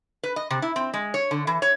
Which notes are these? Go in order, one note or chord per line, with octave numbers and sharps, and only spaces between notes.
B4
D#5
C3
E4
C4
G#3
C#5
D3
E3
C#5